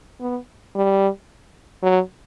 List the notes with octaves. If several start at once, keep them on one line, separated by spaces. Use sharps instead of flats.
B3
G3
F#3